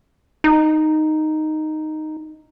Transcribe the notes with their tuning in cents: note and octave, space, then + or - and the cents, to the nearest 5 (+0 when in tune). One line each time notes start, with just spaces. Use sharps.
D#4 -5